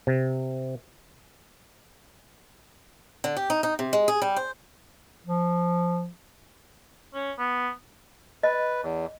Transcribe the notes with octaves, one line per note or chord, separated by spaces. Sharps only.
C3
D3
G4
D#4
D#4
C3
G#3
G#4
G3
C5
F3
C#4
B3
B4 D#5
E2